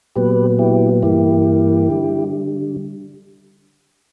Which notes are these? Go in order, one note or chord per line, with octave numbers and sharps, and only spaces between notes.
A#2 F#3 B3 G4 B4
E4 G4
G2 E3 A#3 E4 G4
D3 G3